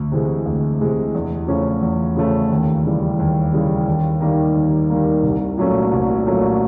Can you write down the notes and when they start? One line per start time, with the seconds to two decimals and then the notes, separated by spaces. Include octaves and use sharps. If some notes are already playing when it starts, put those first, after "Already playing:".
Already playing: D2
0.12 C3 E3 G#3
0.46 D2
0.81 C3 E3 G#3
1.15 E2
1.48 C#3 F3 A3 C#4
1.83 E2
2.16 C#3 F3 A3 C#4
2.51 D#2
2.85 C#3 E3 G3
3.19 D#2
3.53 C#3 E3 G3
3.87 D#2
4.21 D#3 G3 A#3
4.55 D#2
4.90 D#3 G3 A#3
5.23 C2
5.57 A#2 F#3 A3 C#4
5.92 C2
6.26 A#2 F#3 A3 C#4